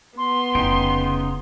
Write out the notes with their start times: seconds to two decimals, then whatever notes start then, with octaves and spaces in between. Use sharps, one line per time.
0.18 B3 C6
0.55 F1 C#3 D#4 E4 G5